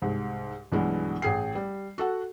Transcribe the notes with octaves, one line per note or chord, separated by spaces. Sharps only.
C2 G#2
B1 G2 B2 E3 G#3
A1 G#4 G5 C7
G3
F#4 A4 F#5